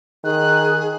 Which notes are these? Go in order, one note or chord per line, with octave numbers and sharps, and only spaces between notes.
D#3 G#4 F#6